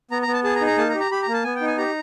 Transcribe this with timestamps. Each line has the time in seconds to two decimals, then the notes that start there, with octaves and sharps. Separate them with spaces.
0.11 B3 A#5
0.22 A#5
0.27 B3
0.33 A5
0.44 G#4 A5
0.56 A#5
0.61 D#4
0.67 A#5
0.78 A#3 A5
0.89 A#5
0.94 G4
1.00 A#5
1.11 G4 B5
1.22 A#5
1.28 A#3
1.33 A5
1.44 B3 G#5
1.55 G5
1.61 D#4
1.67 G#5
1.77 G4 A#5